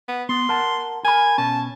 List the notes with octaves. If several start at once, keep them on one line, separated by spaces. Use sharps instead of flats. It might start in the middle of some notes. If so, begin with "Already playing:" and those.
B3
B3 C6
A#4 F#5 A5
A#4 G#5 B5
B2 C#4 A5